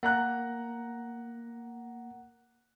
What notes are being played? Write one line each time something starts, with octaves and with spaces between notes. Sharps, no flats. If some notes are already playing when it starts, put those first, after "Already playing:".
A#3 F#5 A#5 F#6